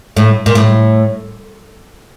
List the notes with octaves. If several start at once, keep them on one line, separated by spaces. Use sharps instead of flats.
A2
A#2
A2